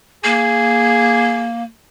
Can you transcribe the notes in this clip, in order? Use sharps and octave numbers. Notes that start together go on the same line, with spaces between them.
A#3 G#4